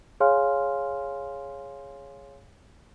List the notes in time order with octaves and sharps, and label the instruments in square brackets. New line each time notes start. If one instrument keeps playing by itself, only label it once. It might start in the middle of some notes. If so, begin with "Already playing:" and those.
[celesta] G#4 C#5 F5 G#5 C6 F6